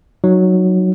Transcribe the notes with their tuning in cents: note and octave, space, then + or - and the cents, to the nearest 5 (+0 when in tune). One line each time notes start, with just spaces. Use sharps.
F#3 +0 D#4 +0